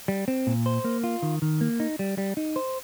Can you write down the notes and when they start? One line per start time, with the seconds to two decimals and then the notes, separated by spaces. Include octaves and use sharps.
0.08 G3
0.28 C4
0.47 A#2
0.66 C5
0.84 A#3
1.04 F4
1.23 D#3
1.42 D#3
1.61 A#3
1.80 D#4
1.99 G3
2.18 G3
2.37 D#4
2.56 C5